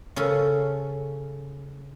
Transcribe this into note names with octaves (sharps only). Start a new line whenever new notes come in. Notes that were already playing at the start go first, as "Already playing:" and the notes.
C#3 C#4 A4